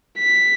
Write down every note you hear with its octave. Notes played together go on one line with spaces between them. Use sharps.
B6